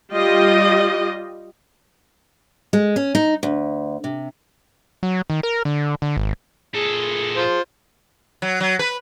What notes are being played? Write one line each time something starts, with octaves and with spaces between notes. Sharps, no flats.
G3 F4 G4 D#5
G#3
C#4
D#4
D2
C3
F#3
D#3
A#4
D3
D3
G#1
A#2 G#4 A4
F4 C5
F#3
F#3
B4